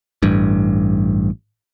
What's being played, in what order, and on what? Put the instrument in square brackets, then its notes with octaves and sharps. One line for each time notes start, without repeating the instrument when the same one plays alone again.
[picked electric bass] A1 G2